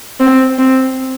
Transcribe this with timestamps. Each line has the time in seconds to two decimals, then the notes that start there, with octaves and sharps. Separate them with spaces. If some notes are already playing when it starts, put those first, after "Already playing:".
0.20 C4
0.59 C4